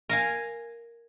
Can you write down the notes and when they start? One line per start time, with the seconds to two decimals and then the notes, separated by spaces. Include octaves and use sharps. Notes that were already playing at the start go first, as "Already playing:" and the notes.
0.09 A#4 F5 G#5